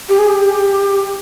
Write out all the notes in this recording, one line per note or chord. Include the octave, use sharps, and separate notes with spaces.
G4
G#4
G4